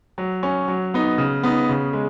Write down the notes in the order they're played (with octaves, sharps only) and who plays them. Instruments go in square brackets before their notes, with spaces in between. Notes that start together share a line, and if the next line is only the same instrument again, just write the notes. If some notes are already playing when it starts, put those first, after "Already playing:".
[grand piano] F#3
C#4
F#3
B3 D#4
C#3
B3 D#4
C#3
G#3